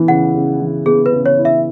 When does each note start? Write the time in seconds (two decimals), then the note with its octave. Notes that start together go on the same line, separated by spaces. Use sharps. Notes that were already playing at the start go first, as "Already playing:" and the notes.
Already playing: E3 B3 E4
0.08 C#3 F#5
0.35 C#3
0.60 E3
0.86 B3 G#4
1.06 B4
1.13 C#3
1.26 C#5
1.39 E4
1.45 E5